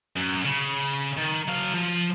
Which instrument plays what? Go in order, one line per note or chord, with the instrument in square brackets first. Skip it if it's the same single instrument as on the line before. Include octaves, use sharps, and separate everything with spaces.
[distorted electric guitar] F#2
C#3
D#3
F#3 F5
F3